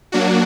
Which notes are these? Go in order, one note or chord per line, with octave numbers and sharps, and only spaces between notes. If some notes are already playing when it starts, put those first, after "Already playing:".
F#3 A#3 D4 F#4